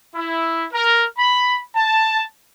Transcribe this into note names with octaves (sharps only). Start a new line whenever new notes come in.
E4
A#4
B5
A5